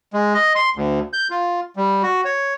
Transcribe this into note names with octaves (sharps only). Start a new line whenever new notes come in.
G#3
D#5
C6
D2
G6
F4
G3
F#4
C#5